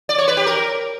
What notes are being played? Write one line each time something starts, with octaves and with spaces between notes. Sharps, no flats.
D5
C#5
B4
G4
A#4